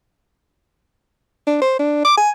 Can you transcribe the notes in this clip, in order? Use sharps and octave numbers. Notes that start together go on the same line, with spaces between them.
D4
C5
D4
D6
G#5